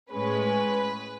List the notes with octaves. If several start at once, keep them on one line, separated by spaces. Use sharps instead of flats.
A2 G#3 C#4 B4